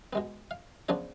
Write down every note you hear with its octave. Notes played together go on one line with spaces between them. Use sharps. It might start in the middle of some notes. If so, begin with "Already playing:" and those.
B2 G#3 B3
F5
C#3 F3 B3 D4 C#5